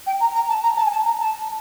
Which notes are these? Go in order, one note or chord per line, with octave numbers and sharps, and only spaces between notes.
G5
A#5
A#5
A5
A#5
A5
G#5
A5
A#5
A5